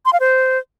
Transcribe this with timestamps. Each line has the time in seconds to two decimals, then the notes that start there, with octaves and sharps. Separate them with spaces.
0.05 C6
0.13 F5
0.20 C5